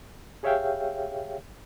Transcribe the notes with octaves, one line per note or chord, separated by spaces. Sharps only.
G4 G#4 C#5 E5 F5 G5